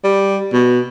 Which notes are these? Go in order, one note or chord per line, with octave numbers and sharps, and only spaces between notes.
G3
B2